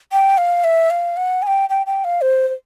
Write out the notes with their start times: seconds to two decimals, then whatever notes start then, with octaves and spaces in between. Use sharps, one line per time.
0.12 G5
0.38 F5
0.64 E5
0.90 F5
1.17 F#5
1.42 G#5
1.47 G5
1.69 G5
1.86 G5
2.04 F5
2.21 C5
2.48 C5